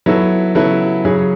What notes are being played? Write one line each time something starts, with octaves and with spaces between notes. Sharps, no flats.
F#3 B3 E4 A4
C#3 F#3 B3 E4 A4
C#3 F#3 C#4 G#4